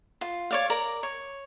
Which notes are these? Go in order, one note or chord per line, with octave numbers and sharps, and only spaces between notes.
F4
C#5 D5 F5
A#4 D5 A#5
C#5